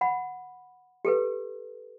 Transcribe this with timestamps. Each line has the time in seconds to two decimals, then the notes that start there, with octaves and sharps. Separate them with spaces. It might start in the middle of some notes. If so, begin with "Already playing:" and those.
0.01 F#5 B5
1.05 G4 A4 B4